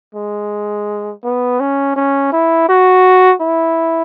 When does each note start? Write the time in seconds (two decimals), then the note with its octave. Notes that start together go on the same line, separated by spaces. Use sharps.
0.15 G#3
1.24 B3
1.60 C#4
1.96 C#4
2.32 E4
2.69 F#4
3.41 E4